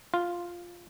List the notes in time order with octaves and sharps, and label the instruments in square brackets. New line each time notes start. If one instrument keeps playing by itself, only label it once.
[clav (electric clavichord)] F4